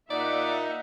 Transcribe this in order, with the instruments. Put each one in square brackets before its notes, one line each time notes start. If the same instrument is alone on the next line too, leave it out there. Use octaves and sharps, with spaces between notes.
[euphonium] A#2 [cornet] D#4 [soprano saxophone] D5 [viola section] E5 F#5